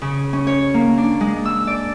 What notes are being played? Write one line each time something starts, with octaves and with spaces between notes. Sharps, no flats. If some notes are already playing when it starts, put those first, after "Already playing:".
C#3
C#4
C#5
A#3
D4
G#3
E6
D5